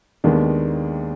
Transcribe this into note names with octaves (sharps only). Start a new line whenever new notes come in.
D#2 D#3 G#3 B3 D4